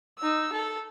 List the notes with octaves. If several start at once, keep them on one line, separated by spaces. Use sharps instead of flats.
D#4 E6
A4